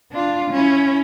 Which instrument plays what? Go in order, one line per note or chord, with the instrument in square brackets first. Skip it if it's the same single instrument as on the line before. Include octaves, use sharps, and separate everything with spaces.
[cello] D4 F4
C#4 E4